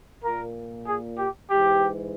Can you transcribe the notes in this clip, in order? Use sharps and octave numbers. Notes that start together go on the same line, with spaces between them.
A#2 A#4
G#4
G4
G#2 E3 G4